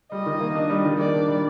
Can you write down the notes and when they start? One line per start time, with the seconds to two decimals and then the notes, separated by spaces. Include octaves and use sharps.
0.12 G3 D#5
0.26 D#3
0.40 A#3
0.55 D4
0.70 G3
0.85 D#3
0.99 A#3 D5
1.14 D4
1.28 G3